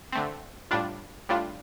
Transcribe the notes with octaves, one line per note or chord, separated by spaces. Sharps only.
D3 A3 C4
A2 G3 D4 F4
A2 G3 D4 F4